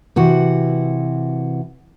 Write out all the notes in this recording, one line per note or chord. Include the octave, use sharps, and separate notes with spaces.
C3 E3 F#4